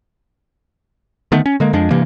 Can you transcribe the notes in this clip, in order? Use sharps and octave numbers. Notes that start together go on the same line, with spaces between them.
D3 D#3 A3 B3
C#4
D3 G#3 A#3
F2 F3 G#3 D4
G2 C3 E3 A#3